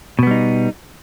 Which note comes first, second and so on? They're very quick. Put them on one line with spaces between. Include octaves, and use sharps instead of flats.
B2 B3 G3 D#4